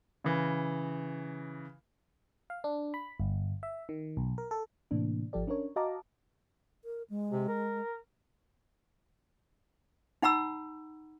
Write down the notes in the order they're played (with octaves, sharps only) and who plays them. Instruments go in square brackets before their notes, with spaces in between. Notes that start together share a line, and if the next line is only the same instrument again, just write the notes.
[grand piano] C#3 E3
[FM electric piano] F5
D4
B5
G1
E5
D#3
B1
A#4
A4
A2 C3 E3 A#3 D4
G#1 F3 G4 A4 D5
C#4 D4 A#4 C#5
F#4 D#5 F5 A5 A#5 D6
[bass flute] A#4
G#3
[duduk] C3
A#4
[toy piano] D#4 F#5 A#5 B5 E6